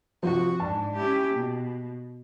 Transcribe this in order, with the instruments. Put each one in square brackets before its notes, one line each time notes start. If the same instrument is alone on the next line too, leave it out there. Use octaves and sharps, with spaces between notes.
[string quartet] C3 F#4 [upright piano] F3
[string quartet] G#2 D4 [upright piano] A5
[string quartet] C#4 E4 G4
B2